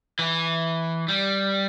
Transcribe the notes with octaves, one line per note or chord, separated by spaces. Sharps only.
E3
G3